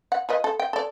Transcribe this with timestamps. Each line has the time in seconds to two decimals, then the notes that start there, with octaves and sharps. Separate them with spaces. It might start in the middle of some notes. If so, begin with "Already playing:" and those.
0.12 F#5
0.29 F4 B4 D#5
0.44 A4
0.60 G5
0.73 A4 D5